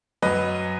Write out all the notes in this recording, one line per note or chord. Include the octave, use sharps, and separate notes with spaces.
F#2 F#3 B4 D#5